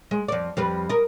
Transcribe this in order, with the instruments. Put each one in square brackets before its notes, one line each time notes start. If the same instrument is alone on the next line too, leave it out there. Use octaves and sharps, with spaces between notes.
[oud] G#3
F2 D5
F2 G3 B4
A#4 D#5